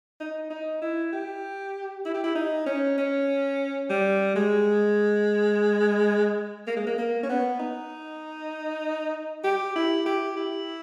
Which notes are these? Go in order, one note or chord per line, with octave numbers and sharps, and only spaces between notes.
D#4
D#4
E4
G4
E4
G4
E4
D#4
C#4
C#4
G3
G#3
A#3
G#3
A#3
A#3
C#4
B3
D#4
G4
E4
G4
E4